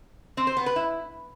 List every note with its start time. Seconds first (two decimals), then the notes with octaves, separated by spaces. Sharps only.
0.37 C4
0.47 C5
0.57 B3
0.66 B4
0.76 E4